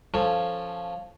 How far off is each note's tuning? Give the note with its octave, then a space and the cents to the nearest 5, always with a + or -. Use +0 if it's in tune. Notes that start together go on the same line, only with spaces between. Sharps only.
F3 +0 C#4 +0 A4 +10